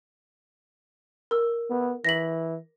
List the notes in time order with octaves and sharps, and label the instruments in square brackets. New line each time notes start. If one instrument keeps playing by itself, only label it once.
[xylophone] A#4 E6
[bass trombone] B3
[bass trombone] E3 [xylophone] A#6 B6 F#7